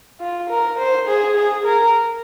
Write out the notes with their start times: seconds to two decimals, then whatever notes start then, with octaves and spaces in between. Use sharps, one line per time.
0.20 F4
0.50 A#4
0.78 C5
1.07 G#4
1.36 G#4
1.66 A#4